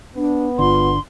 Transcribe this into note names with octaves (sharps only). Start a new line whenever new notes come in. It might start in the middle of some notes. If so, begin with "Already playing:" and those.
B3 D4
G1 D3 F4 C6